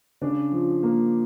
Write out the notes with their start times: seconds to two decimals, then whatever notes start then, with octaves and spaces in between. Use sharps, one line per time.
0.21 C#3 D4
0.52 F3
0.83 A#3